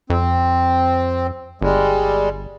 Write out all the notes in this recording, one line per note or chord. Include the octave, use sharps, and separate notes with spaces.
F2 C4
G1 G3 G#3